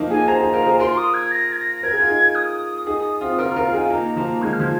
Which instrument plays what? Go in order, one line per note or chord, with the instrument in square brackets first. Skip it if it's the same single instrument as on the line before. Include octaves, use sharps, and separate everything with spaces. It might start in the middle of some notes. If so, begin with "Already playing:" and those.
Already playing: [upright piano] F3 A#3 D#4
[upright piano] D#4 G#4 [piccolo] G#5
[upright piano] G#4 C5 [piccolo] A#5
[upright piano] D#4 G#4
F4 A#4
G#4 C5
[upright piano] F4 A#4 [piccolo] C6
[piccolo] C6
D#6
G#6
A#6
G#6
A#6
A#6
[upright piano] A#4 [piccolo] G#6
[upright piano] G#4
F4
D#4 G#4
[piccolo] D#6
[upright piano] D#4 G#4
C4 F4
[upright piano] F4 A#4 [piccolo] F6
[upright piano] F4 A#4 [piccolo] A#5
[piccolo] F5
[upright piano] D#4 G#4 [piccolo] G#5
[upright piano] F4
[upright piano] A#3 D#4 [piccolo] A#5
[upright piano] F3 A#3
[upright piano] D#3 G#3 [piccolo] G#6
[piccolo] F6
[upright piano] F3
[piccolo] G#6